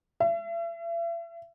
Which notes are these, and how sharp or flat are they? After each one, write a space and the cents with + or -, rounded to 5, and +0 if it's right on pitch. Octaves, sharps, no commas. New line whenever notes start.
E5 +40